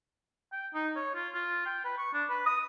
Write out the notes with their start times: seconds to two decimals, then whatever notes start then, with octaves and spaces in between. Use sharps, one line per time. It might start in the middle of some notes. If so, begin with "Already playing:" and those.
0.52 G5
0.74 D#4
0.96 C#5
1.15 F4
1.34 F4
1.66 G5
1.85 B4
1.98 C#6
2.14 D4
2.29 B4
2.47 D#6